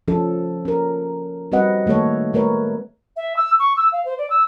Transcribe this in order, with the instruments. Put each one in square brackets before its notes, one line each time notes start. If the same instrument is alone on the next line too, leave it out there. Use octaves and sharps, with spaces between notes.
[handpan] F3 C#4 A4
C#4 A#4
G3 C4 F#4 B4 D#5 F#5
D#3 A3 A#3 A4 C#5
G#3 A3 A#4 B4 C#5
[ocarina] E5
E6
C#6
E6
F5
C5
D5
E6